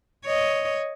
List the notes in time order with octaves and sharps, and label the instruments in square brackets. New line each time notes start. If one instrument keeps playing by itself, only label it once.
[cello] C#5 D#5